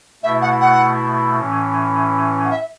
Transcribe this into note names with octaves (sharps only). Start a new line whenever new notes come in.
B2 A3 E4 E5
F#5
F#5
A2 E3 C#4
F#5
E5